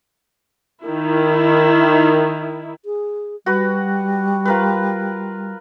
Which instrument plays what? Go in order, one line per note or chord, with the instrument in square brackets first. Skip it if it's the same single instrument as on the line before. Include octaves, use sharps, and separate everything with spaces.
[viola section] D#3 E4
[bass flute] G#4
[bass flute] G3 [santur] F#4 B4
[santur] F4 A#4 B4